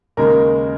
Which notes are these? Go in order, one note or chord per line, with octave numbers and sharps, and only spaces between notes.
D#2 C#3 G#3 A#4